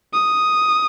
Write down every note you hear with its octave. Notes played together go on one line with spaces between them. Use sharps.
D#6